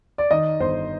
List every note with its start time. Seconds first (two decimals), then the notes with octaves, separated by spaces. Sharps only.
0.18 D5
0.31 D#3 D#5
0.60 G1 C5